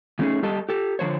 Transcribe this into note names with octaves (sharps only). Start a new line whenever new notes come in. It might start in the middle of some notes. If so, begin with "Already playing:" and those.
E3 A3 B3 C#4 D#4 G#4
G3 G4 A4 D#5 A5
G4 A4
D3 F3 C5 C#5